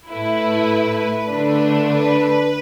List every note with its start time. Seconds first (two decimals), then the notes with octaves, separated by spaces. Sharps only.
0.10 A2 A3 E4 B4
1.29 D3 A3 D4
1.88 B4